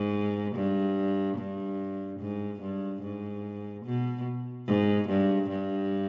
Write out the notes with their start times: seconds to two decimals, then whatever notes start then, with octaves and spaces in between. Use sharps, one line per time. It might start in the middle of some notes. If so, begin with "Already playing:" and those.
Already playing: G#2
0.55 G2
1.38 G2
2.19 G#2
2.61 G2
3.02 G#2
3.85 B2
4.67 G#2
5.09 G2
5.50 G2